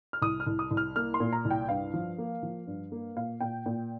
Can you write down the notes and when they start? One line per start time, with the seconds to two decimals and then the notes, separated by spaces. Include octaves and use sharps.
0.13 F6
0.22 C2 D#6
0.40 F6
0.47 C2
0.59 D#6
0.71 C2
0.77 F6
0.96 A#3 F6
1.14 C6
1.20 A#2
1.33 A#5
1.45 C2
1.51 G5
1.69 G2 F5
1.94 F3
2.18 A#3
2.43 F3
2.67 G2
2.92 A#3
3.16 A#2 F5
3.40 A#2 G5
3.66 A#2 G5